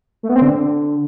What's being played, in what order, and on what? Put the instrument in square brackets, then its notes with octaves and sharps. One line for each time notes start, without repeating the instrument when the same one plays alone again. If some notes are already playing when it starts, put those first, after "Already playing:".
[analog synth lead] A3
B3
C4
D3